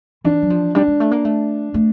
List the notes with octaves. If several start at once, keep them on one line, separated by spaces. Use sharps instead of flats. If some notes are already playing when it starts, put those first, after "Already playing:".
E3 D4
F#3
F3
G3 D4
G#3
A3
A#3
A3
A3